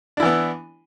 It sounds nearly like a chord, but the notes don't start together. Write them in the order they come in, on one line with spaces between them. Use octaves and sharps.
D4 E4 E3 B3